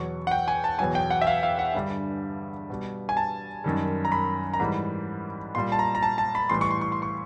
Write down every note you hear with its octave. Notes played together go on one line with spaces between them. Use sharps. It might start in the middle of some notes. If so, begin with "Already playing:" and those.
Already playing: E2 B2 F#3 C#6
F#5
G5
G#5
A5
E2 B2 F#3 G#5
G5
F#5
E5
F5
F5
F#5
G2 D3 G3
B2 G3
G#5
A5
F#2 D#3 G3
A#5
B5
A#5
G#2 E3 G3 B5
A#2 G3 C6
A5
A#5
A#5
A5
A5
B5
A2 E3 G3 C6
C#6
C6
C#6
C6
C#6